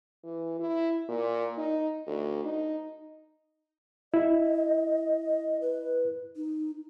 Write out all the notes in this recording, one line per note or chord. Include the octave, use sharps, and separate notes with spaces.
E3
E4
A#2
D#4
D2
D#4
E4 D#5
B4
D#4